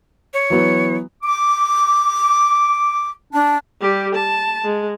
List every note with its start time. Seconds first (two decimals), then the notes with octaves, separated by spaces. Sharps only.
0.34 C#5
0.50 E3 F#3 B3
1.23 D6
3.33 D4
3.81 G3 G4
4.15 A5
4.64 G#3